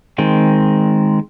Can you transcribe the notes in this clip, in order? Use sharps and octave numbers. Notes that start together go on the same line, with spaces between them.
D#3 G#3 C4